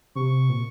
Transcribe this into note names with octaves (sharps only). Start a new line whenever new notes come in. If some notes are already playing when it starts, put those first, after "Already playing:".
C3 C#6
A#2